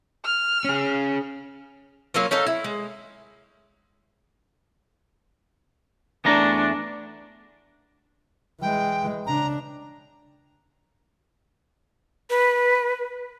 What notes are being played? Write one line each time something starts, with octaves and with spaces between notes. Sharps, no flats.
F6
C#4 G#4
F#3 A#3 C#4 F4
C#4 D#4 A4 F5
E4
G#3
E2 A3 D4 A#5
E3 G#3 G5
C#3 D4 A#5
B4